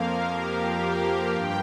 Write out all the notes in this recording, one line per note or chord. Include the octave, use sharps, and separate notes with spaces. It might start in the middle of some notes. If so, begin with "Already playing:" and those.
Already playing: F2 F3 A#3 A#4 F5
G4
G4
G2 G5